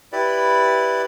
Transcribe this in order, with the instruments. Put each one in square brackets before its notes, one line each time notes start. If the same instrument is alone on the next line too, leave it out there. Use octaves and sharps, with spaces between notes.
[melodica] E4 G4 B4 D5